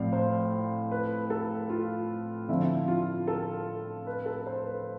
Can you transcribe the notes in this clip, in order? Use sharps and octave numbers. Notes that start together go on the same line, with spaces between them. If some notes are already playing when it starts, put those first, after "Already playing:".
Already playing: A2 F3 C4 D5 F5
C5
B4
A4
F4
D3 F3 C4 E4
F4
A4
B4
A4
C5
B4